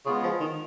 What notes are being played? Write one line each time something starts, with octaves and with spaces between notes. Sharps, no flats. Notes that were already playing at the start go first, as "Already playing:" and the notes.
C#3 G#3 B3 F4 G#4
F3
D#3